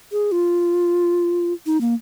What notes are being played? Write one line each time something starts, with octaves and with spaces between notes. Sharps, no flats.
G#4
F4
D#4
A#3